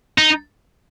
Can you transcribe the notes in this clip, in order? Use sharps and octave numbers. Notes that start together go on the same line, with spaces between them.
D#4